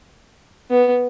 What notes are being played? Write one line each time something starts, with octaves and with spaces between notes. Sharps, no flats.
B3